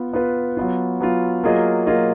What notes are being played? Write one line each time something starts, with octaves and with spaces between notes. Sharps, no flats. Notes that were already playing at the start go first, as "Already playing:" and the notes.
Already playing: B3 F4 B4
B3 F4 B4
F#3 B3 F4
F#3 B3 F4
F#3 A#3 F4 G#4 D#5
F#3 A#3 F4 G#4 D#5